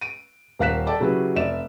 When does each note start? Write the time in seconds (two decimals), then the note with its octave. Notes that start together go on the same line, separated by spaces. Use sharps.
0.01 D7 D#7
0.59 D#1 A#4 F5 F#6 B6 E7
0.87 A4 D5 G5 A5 D6
1.00 C#3 F#3 E4 G4 G#4 B4
1.36 F1 D5 E5 E7